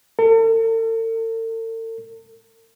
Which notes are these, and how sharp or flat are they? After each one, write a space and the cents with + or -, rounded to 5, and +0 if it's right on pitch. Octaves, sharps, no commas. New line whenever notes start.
A4 +45